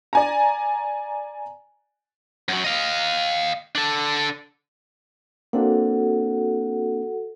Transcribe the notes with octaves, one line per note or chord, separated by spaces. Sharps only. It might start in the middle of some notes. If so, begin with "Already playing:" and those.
D5 G#5 A#5
F#2 F#3
D#5 F5
D4 A4
A#3 C4 D4 F#4 A4 F#5